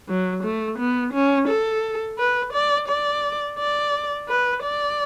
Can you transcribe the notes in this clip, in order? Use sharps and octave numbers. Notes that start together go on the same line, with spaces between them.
F#3
A3
B3
C#4
A4
B4
D5
D5
D5
B4
D5